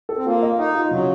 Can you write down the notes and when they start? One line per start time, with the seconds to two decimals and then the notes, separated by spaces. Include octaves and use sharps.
0.09 A4
0.17 C4
0.26 A#3 F4
0.42 D#5
0.58 D#4 D#5
0.75 F4
0.91 C#3 F#3